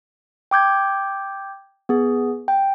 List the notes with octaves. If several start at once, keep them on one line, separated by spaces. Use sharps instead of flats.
G5 D6 G6 G#6
B3 G#4
G5